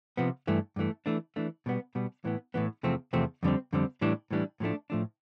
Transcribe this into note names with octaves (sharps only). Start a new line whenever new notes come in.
C3 F3 B3
G2 E3 A3
G2 E3 A3
E3 A3 D4
E3 A3 D4
B2 G3 B3
B2 G3 B3
A2 E3 B3
A2 E3 B3
E2 C3 F3 A3 C4
E2 C3 F3 A3 C4
F2 D3 G3 C4
F2 D3 G3 C4
A2 E3 G3 D4
A2 E3 G3 D4
A2 F3 A3 D4
A2 F3 A3 D4